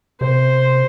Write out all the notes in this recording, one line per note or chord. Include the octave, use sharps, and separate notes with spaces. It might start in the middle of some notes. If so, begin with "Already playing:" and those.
C3 C5